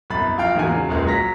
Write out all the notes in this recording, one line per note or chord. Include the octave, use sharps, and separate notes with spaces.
C2 F#2 B2 B5 A6
A#1 F4 F5 G5 F6
E2 G#2 G#3 A#3 F#4 G#5
C#3 F#3
F#1 C#2 A#2 G#3
F#3 A#6 B6